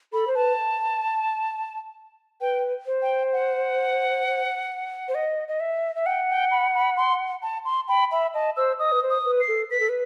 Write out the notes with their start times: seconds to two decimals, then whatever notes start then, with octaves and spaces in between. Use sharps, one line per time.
0.13 A4 B5
0.27 C5
0.35 B4 A5
2.41 B4 G5
2.86 C5
3.02 G5
3.33 F#5
5.08 C5
5.15 D#5
5.48 D#5
5.60 E5
5.95 E5
6.06 F#5 G5
6.29 G5
6.51 B5
6.74 B5
6.97 C6
7.42 A5
7.65 C6
7.88 G5 B5
8.11 E5 B5
8.34 D#5 A5
8.56 C5 E6
8.79 D#5 D#6
8.92 B4
9.02 C5
9.10 D#6
9.25 B4
9.40 C7
9.48 A4
9.71 B4 B6
9.80 A4
9.89 B4